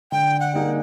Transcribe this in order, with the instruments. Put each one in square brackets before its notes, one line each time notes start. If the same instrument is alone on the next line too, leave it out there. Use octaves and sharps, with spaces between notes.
[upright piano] D3 [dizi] G5
[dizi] F#5
[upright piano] G3 A#3 D#4 G#4